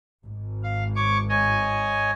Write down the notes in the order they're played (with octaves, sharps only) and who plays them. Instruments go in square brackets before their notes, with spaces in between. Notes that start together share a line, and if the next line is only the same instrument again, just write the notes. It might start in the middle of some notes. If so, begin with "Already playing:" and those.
[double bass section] G#1 G#2
[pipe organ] F5
C#5 C#6 D6
C#5 D#5 G#5